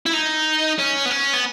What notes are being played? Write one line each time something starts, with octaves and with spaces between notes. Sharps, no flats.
E4
D#4
C#4
B3
C#4
B3